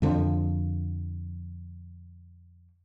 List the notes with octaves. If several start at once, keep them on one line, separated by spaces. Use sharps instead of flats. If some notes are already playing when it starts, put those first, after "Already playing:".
F2 D3 F3